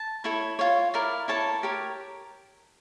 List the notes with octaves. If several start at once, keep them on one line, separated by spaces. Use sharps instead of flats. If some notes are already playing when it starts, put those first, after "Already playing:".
Already playing: A5
E4 A4 C#5
F4 C#5
E4 A#4 D5
E4 A4 C#5 A5
G4 A#4 C#5